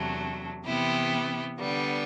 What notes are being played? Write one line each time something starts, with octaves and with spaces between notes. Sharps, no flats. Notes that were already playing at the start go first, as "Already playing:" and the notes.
Already playing: E2 C3 F#3 A3 D4
C3 E3 B3 E4 G4
D3 G3 B3